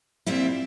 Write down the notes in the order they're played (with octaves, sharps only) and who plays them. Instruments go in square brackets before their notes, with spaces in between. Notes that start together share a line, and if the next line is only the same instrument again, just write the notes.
[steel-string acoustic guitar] A#2 G3 C4 E4